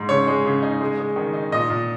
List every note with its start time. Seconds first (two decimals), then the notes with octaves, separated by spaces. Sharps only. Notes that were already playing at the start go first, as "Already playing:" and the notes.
Already playing: G#2
0.09 C#3 C#5
0.27 G#3
0.45 C#3
0.62 D#4
0.81 G#3
0.98 G#3
1.16 D#3
1.33 D#4
1.52 A#2 D#5
1.70 A#2